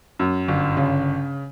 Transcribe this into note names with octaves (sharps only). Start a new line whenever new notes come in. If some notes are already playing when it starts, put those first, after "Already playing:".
F#2
G1
C#3